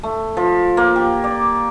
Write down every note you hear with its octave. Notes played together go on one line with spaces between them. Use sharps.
A3
F3
A#3
G4
D5